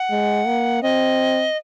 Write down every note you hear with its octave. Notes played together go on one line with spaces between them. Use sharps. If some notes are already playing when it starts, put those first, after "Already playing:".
Already playing: F#5
G#3
A#3
C4 D#5